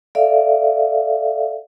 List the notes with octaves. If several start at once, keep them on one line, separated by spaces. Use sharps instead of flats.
A4 D5 E5 F5